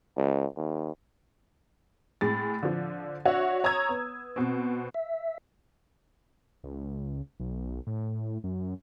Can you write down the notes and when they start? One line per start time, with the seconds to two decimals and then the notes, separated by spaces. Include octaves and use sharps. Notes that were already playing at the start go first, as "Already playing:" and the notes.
0.17 C#2
0.57 D#2
2.21 A2 G#3 A6
2.63 D3 F3
3.25 D4 F#4 C#5 E5 F#5
3.64 C#5 A#5 D#6 E6 G#6
3.89 B3
4.36 B2 C4
4.94 E5
6.64 C#2
7.40 B1
7.87 A2
8.44 F#2